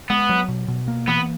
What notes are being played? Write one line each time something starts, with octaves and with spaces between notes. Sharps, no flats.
G#3 B3
F#3
B2
B2
A#3
E3 B3